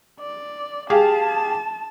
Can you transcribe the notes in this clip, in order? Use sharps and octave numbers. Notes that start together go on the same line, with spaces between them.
D5
G4 G#4 F5 A5